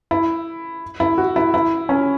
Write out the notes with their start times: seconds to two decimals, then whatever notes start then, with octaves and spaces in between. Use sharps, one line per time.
0.11 E4
1.00 E4
1.18 F#4
1.36 E4
1.54 E4
1.89 C#4